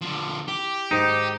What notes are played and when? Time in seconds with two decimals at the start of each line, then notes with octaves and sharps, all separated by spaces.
0.01 D3 F3
0.48 E4 G4
0.91 G#2 D#3 C4 D#4